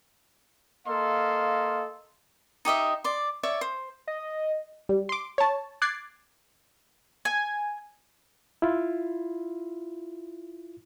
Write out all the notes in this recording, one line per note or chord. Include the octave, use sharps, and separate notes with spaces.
A#3 A4 D#5 F5 C6
D#4 G4 D#5 E5
D5 C6
C#5 D5 E5 C#6
C5
D#5
G3
C6 D6
C#5 A5
D6 F#6 G#6 A6 C7
G#5
E4 F4